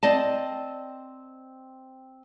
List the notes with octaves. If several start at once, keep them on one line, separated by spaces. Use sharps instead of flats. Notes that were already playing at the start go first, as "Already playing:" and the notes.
C4 D5 D#5 A5